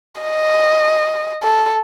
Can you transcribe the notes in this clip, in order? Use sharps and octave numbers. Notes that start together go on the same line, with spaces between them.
D#5
A4